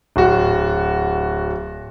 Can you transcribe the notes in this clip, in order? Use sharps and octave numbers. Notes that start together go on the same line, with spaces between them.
D1 F#4